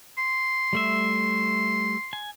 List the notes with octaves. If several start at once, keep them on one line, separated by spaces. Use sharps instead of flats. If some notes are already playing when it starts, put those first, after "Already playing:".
C6
G3 A3 E5
G#5